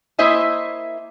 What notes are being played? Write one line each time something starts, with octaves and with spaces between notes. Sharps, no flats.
A#3 E4 C5 D#5 E5 G#5